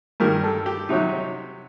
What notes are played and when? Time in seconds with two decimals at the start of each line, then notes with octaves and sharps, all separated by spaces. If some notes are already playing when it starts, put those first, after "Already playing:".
0.20 G2 D#3 G3 A#4
0.44 A4
0.66 G4
0.89 C3 F#3 D#4